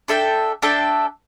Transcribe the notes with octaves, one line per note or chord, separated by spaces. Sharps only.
D4 A4 E5 G5
D4 A4 E5 G5